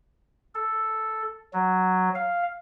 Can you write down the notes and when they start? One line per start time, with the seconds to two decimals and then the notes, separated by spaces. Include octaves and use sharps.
0.55 A4
1.53 F#3
2.15 F5